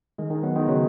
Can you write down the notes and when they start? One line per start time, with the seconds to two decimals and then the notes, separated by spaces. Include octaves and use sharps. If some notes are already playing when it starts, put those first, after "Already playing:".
0.18 D#3 G#3
0.30 D#3 G#3
0.43 F#3 B3
0.56 D#3 G#3
0.68 C#3 F#3